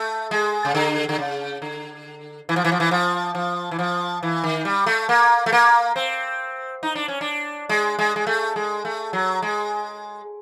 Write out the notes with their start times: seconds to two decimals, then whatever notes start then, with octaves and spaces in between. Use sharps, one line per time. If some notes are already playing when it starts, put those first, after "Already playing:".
Already playing: A3
0.31 G#3
0.65 C#3
0.75 D3
1.09 D3
1.19 C#3
1.62 D3
2.49 E3
2.56 F3
2.64 E3
2.72 F3
2.80 E3
2.91 F3
3.35 F3
3.71 E3
3.79 F3
4.23 E3
4.44 D#3
4.65 G3
4.86 A3
5.09 A#3
5.46 A3
5.52 A#3
5.96 C4
6.83 D#4
6.95 D4
7.08 C#4
7.21 D4
7.69 G#3
7.99 G#3
8.16 G#3
8.27 A3
8.56 G#3
8.85 A3
9.13 F#3
9.42 G#3